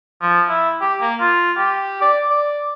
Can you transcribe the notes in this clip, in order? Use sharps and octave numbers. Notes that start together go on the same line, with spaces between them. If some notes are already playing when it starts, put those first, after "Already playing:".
F3
E4
G4
A#3
F4
G4
D5
D5